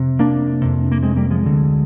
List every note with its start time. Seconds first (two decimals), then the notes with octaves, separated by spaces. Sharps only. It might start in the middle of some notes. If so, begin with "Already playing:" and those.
Already playing: F2 C3
0.19 A#3 D4
0.61 F2 C3
0.92 A#3
1.03 G#3 C4
1.16 G3 A#3
1.31 F3 G#3
1.44 D2 D3